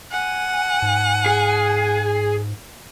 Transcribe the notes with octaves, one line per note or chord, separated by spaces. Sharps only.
F#5 G#5
G#2
G#4